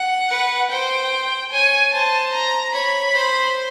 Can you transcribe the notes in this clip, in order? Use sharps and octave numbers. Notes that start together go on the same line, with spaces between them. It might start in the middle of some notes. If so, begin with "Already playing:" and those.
Already playing: F#5
B4
C5 G5
C#5 G#5
C5 A5
A#5
C#5 B5
C5